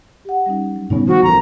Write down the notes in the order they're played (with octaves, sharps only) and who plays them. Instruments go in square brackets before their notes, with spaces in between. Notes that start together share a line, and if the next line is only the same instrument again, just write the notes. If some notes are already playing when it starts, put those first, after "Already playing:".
[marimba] G4 F#5
G3 C#4 D#4
F#3
[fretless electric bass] A2 C#3 C#4 [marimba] G3 B3 D#4
[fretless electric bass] D#3 F3 [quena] F#4
[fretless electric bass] A1 F3 [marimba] A4 A#4 [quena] A#5